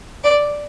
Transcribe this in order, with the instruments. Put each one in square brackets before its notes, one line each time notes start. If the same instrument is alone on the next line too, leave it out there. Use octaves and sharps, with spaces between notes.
[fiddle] D5